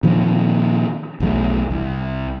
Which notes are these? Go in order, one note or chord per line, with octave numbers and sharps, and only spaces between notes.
A#2 D#3 F3 C4
B1 E2 F3 A3
C2